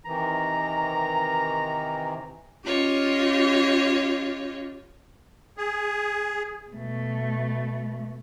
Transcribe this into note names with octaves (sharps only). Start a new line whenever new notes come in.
C3 D#3 E3 A#5
C#4 F4 G4 C#5 D#5
G#4
B2 A3